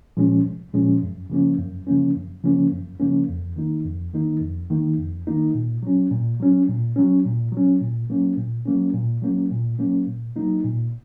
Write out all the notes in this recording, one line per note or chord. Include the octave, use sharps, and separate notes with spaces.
A#2 F3 G#3 C#4
C2
A#2 F3 G#3 C#4
F#2
C#3 F3 A#3 C#4
F#2
C#3 F3 A#3 C#4
F#2
C#3 F3 A#3 C#4
F#2
C#3 F3 A#3 C#4
F2
D#3 A#3 D#4
F2
D#3 A#3 D#4
F2
D#3 A#3 D#4
F2
D#3 A#3 D#4
A#2
F#3 C#4
A#2
F#3 C#4
A#2
F#3 C#4
A#2
F#3 C#4
A#2
F#3 A#3 C#4
A#2
F#3 A#3 C#4
A#2
F#3 A#3 C#4
A#2
F#3 A#3 C#4
A#2
F#3 A#3 D#4
A#2